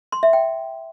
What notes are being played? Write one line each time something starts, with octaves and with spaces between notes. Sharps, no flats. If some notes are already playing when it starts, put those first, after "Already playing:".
C6
E5
G5